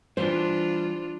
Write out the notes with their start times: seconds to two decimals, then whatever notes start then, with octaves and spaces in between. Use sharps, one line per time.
0.17 E3 G3 D4 F4 C5